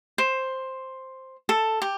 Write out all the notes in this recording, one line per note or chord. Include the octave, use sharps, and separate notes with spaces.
C5
A4
G4